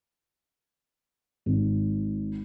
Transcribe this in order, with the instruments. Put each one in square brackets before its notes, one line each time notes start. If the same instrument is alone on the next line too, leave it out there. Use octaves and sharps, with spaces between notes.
[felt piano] G#1